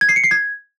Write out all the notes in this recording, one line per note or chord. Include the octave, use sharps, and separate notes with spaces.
G#6
C7
C#7
C7
G#6